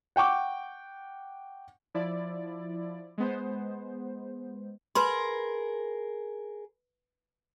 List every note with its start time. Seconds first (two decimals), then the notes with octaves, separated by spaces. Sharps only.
0.16 F#5 G5 C#6 D6
1.94 F3 E4 D5
3.18 G#3 B3 C5
4.95 G#4 A#4 B4 B5 C6